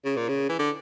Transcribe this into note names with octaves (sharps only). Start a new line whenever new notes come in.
C#3
A#2
C#3
E3
D3